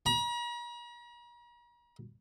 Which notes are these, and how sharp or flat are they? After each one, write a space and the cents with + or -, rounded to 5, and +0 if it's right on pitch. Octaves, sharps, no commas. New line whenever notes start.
A#5 +45